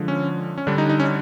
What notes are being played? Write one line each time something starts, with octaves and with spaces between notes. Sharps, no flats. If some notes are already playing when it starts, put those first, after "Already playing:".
Already playing: D3 F3 G#3
C#4
C#4
D3 G3 D4
D#4
D#4
C#4